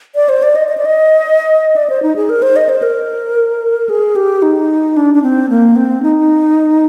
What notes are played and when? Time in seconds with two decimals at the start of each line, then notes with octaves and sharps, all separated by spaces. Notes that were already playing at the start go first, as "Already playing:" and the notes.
0.15 D5
0.29 C5
0.43 D5
0.55 D#5
0.69 D#5
0.77 D5
0.85 D#5
1.76 D5
1.90 C5
2.03 D#4
2.16 G#4
2.29 A#4
2.42 C5
2.56 D#5
2.69 C5
2.83 A#4
3.89 G#4
4.16 G4
4.42 D#4
4.97 D4
5.14 D4
5.22 C4
5.50 A#3
5.76 C4
6.03 D#4